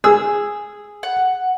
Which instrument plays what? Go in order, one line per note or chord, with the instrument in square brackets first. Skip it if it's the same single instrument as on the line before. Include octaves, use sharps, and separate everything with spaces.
[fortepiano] G#4 [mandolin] E6
[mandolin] F#5